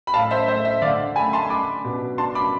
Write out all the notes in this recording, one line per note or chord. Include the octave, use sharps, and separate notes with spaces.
B5
A2 F5 A5
C5 E5
A3 C5 E5
C5 E5
D3 D5 F5
A3 G#5 B5
A5 C6
D4 B5 D6
B2
D4 A5 C6
B5 D6